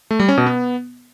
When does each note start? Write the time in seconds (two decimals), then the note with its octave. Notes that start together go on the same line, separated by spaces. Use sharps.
0.11 A3
0.20 G3
0.29 C#4
0.37 B2
0.46 B3